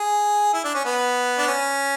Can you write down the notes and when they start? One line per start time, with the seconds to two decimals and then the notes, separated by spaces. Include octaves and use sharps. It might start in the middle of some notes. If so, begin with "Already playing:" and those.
Already playing: G#4
0.53 E4
0.64 D4
0.74 C#4
0.85 B3
1.38 D4
1.48 C#4